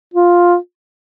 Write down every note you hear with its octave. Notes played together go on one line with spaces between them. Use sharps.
F4